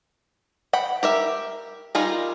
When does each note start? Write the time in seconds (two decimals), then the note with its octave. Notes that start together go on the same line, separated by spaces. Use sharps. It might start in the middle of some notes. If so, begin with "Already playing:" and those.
0.73 F#5 G5 B5
1.03 G4 A#4 E5
1.95 G3 D#4 F4 G#4 A#4